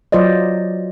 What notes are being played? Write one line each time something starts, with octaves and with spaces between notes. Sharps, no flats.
F#3 F4 C5 D5 D#5